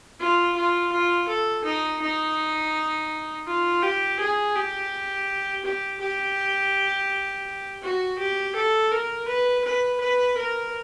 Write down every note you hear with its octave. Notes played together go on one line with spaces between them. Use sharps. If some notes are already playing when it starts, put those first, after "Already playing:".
F4
F4
F4
A4
D#4
D#4
F4
G4
G#4
G4
G4
G4
F#4
G4
A4
A#4
B4
B4
B4
A#4